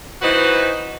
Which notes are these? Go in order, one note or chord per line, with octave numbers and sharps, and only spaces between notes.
E3 D#4 F#4 B4 C5